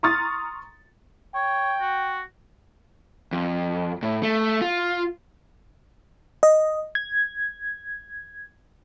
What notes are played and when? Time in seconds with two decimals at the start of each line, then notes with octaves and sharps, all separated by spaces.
0.03 A#5 C6 C#6 D#6 F6 A6
1.35 C#5 G5
1.81 F#4
3.32 F2
4.03 A2
4.23 A3
4.62 F4
6.43 D#5
6.95 G#6